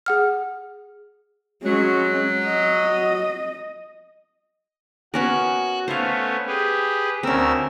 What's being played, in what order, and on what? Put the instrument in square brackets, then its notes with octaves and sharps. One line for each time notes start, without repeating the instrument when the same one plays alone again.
[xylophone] G#4 F#5 F6
[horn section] F#3 [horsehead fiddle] G#3 C#4
[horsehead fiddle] D#5
[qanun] B3 C#4 A#4 [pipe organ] F#4 F#6
[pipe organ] A3 B3 C#4 [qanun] C5 F5
[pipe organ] G4 G#4 B4
[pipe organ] D2 A#4 E6 [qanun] C4 C#4